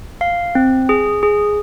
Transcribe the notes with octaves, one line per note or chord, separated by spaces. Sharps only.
F5
C4
G#4
G#4